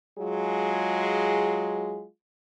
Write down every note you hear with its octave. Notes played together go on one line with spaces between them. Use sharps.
F#3 G#3 F4 G#4